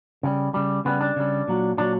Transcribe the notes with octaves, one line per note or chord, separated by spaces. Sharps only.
C#3 G3
C#3 G3
C#3 G3 B3
D4
C#3 G3
A#2 F#3
A#2 F#3 D4